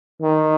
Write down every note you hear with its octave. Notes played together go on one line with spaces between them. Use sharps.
D#3